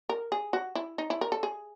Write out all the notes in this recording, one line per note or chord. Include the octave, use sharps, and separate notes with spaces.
A#4
G#4
F#4
E4
D#4
E4
A#4
A4
G#4